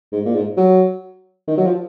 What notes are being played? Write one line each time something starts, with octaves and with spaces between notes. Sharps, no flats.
G#2
A#2
G#2
F#3
D#3
F#3
F3